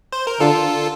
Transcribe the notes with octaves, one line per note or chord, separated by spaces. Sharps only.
C5
A#4
D3 F4 A4